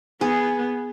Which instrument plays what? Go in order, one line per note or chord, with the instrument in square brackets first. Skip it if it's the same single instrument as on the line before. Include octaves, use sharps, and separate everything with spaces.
[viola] B3 [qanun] G#4